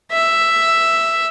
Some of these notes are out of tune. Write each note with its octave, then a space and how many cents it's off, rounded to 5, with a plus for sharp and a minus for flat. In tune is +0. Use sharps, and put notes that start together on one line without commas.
E5 +5